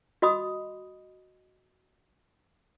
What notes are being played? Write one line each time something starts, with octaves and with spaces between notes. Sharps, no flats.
F#4 D#5 B5 D#6